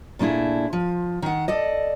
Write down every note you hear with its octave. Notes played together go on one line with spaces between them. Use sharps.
A#2 A3 D4 E4 G#4
F3
D#3 F#5
A4 D5 D#5